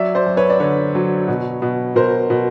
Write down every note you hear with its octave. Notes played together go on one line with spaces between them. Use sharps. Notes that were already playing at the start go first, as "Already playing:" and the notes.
Already playing: F#3 D5 E5
C5 D5
F#2
B4 C#5
D5
D3 B4 C#5
F#3
B2
B2
B2 A#4 C5
B2